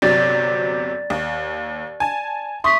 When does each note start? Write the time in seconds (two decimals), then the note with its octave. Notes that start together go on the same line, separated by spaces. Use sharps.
0.02 G1 C3 F#3 D5 A6
1.10 D#2
2.00 G#5 A5
2.64 E5 C6 C#6 D#6 B6